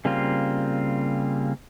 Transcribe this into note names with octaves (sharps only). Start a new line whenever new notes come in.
C#3 G3 A#3 C4 F4